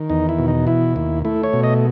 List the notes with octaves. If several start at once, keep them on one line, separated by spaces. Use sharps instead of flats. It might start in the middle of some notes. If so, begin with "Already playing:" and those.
Already playing: D#3
E2 D#4
E4
B2
D#4
E3 E4
D#2
A3 E4
C#5
B2
D#5